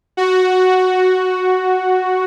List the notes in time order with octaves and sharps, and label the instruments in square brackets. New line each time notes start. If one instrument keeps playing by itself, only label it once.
[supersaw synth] F#4